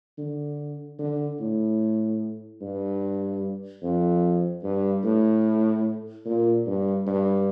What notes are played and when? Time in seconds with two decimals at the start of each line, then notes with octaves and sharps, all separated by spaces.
0.18 D3
0.99 D3
1.40 A2
2.61 G2
3.82 F2
4.63 G2
5.04 A2
6.25 A#2
6.66 G2
7.06 G2